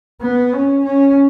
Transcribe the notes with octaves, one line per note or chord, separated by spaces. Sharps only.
B3
C#4
C#4